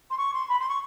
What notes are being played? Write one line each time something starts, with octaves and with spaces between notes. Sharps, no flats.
C6
C#6
C6
B5
C6
C#6